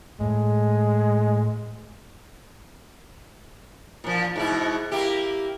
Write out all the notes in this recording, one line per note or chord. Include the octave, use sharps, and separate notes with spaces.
A2 G#3
A#2 F3
G#2 B2 E4
A#3 E4 G4